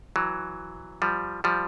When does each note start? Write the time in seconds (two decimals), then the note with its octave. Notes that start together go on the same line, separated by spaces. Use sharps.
0.16 E3 F#3
1.02 F3 G3
1.44 F3 G3